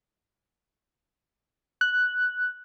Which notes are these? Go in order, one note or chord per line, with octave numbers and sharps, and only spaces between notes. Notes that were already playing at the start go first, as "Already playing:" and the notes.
F#6